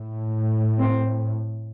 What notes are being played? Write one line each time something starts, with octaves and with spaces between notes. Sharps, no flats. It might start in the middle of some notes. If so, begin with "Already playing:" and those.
Already playing: A2
C4